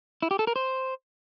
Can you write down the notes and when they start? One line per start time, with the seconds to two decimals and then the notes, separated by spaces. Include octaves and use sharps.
0.22 E4
0.31 G4
0.39 A4
0.47 A#4
0.56 C5